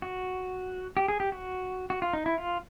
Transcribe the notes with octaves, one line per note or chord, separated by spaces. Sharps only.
F#4
G4
G#4
G4
F#4
F#4
F4
D#4
E4
F4